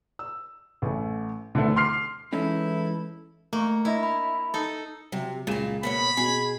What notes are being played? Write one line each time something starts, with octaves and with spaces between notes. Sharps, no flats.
E6
A1 A3
D2 D3 E3 A3
C6 D6 F6 C7
E3 G#3 C#4 D#4 E4 A4
A3 A#3 C#6
D4 E4 D#5 A#6
B5
D#4 A4
C3 F#3
C#2 A#2 A#3 G#4 E7
B2 A#3 F#4 C#5 B5
B2 F#4 G#4